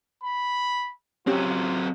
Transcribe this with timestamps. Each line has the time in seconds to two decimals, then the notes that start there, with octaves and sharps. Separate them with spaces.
0.23 B5
1.27 F#3 C4 C#4 F4 G4